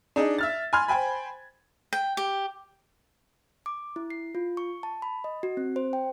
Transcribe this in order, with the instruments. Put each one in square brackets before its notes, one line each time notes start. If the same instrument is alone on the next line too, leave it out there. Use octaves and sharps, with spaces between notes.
[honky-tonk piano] D4 D#4 G#4 D#5
E5 F6 A6
G#5 B5 C6 F6 G#6
C5 G5 G#5 B5
[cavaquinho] G5
G4
[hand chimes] D6
E4
C7
F4
C#6
A5
B5
D#5
F#4
C4
C5
G5